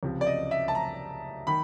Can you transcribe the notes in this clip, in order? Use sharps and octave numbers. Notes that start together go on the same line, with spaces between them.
C#2 C3 F3
D5
D#5
E5
A5
A#5
D#3 B5